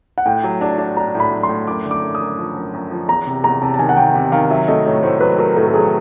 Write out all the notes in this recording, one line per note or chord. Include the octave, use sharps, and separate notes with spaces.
F#5
A2 G5
F#3
D4 A5
D4
D4 A#5
A2
B5
F#3
C6
A2
F#2 D6
D3
D6
F#2
D#6
F#2
F3
F#2
F#2
F3
E2 A#5
C3
E2 A#5
C3 A5
A5
D#3 G#5
F#5
D#3 G5
C3 G5
D#3 F5
F#3 E5
A3 D#5
A2 C#5
A2 C5
F#3 B4
F#3 A#4
A2 A4
A4
F#3 G#4